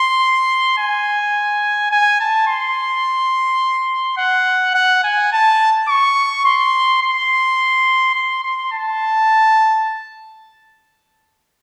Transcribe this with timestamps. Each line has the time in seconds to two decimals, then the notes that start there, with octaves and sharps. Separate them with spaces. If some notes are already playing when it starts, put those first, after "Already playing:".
Already playing: C6
0.78 G#5
1.91 G#5
2.20 A5
2.48 C6
4.18 F#5
4.74 F#5
5.03 G#5
5.32 A5
5.88 C#6
6.45 C6
7.02 C6
8.15 C6
8.43 C6
8.72 A5